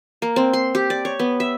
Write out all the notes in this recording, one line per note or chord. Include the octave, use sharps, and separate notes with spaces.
A#3
C4
C6
G4
D5
C#5
B3
E5